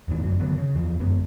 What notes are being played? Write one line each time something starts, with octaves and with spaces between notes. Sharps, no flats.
E2 A2 D#3
F#1 F#2 C3 F#3
D3 D#3 F#3 B3
C#3
E2 F3
G1 F#2 G#3 B3